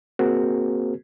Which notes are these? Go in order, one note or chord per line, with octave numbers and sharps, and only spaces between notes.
A#3 C4 F#4 G#4 A#4 C5